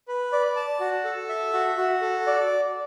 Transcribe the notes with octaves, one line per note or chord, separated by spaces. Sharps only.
B4
D5
A5
F#4
A4
E5
F#4
F#4
A4
D5